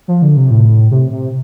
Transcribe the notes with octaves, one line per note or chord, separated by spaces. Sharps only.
F3
D3
C3
A2
C3
C3